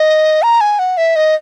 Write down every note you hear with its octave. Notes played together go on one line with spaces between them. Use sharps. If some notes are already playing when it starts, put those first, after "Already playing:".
Already playing: D#5
A#5
G#5
F#5
E5
D#5